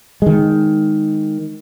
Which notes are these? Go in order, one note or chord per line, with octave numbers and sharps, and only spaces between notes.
D#3 G#3